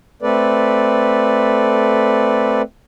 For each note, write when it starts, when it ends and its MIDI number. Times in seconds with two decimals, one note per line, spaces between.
0.22 2.62 57
0.22 2.62 60
0.22 2.62 69
0.22 2.62 71
0.22 2.62 74